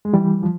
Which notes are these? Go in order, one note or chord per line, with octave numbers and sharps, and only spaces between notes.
G#3
E3 G3
F3